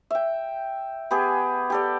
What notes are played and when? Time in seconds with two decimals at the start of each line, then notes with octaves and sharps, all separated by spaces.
0.11 E5 G5
1.11 B3 G4 G#4
1.70 G4 A4 D5